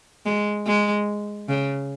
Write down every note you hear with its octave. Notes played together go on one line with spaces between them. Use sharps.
G#3
G#3
C#3